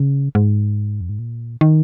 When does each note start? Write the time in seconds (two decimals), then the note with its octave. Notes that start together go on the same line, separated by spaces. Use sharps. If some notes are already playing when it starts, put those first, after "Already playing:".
Already playing: C#3
0.35 G#2
1.01 F2
1.09 G#2
1.19 A#2
1.61 D#3